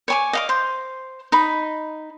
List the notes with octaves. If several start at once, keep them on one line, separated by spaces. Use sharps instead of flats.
C#5 G#5 D6
D#5 F5 D6
C5
D#4 B5